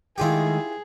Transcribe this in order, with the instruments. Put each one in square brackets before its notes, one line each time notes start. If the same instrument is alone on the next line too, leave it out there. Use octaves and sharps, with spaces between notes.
[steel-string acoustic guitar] D#3 G#3 A3 [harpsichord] E4 F4 G4 [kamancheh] G#4